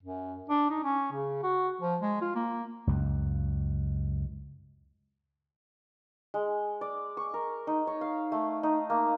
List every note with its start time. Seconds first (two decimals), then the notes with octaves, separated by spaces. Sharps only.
0.03 F#2
0.49 D4
0.70 D#4
0.83 C#4
1.12 C#3
1.43 F#4
1.81 F3
2.00 G#3
2.21 F4
2.35 A#3
2.87 C#2 F#2
6.34 G#3
6.81 D5
7.17 C#6
7.34 A#4
7.67 D#4
7.87 C#5
8.01 F5
8.32 A3
8.63 D#4
8.90 A#3